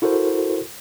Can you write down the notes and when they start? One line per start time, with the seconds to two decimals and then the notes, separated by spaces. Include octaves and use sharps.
0.02 E4 F#4 A4 A#4 C5